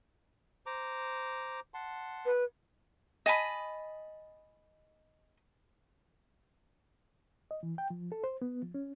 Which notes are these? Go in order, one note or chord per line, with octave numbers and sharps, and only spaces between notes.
C5 A#5 D6
F#5 A5 C6
B4
D#5 G#5 A5 B5
D#5
E3
G5
F3
A4
C5
B3
F3
C#4